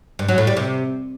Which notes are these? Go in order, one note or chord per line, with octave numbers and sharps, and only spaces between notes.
G2
F#3
A2
G3
C3